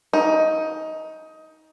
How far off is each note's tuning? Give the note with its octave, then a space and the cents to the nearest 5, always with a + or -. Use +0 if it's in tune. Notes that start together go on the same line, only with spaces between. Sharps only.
D#4 +20